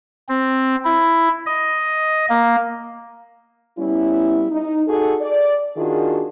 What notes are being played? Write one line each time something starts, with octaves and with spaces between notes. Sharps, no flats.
C4
E4
D#5
A#3
G3 B3 C#4 E4
D#4
D#4 F#4 G#4 A4
D5
D#3 D4 F4 F#4 G#4